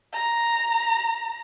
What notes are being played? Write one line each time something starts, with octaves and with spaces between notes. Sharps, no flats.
A#5